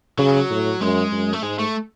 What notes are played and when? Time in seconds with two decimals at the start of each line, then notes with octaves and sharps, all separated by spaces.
0.19 C#3 F#3
0.50 A2
0.81 F#2 G#3
1.12 F#2
1.33 A3
1.43 G#2 G#3
1.59 A3